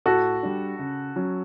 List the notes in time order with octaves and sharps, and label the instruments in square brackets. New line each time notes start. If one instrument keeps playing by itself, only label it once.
[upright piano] A2 [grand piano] F#4 A4
[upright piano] G3 D4
C#3
F#3 C#4